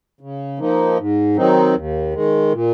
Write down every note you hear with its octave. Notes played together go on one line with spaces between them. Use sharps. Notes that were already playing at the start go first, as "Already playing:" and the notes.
C#3
F3 A#3 D#4
G#2
D#3 F#3 C4 D#4
D#2
D#3 G#3
A#2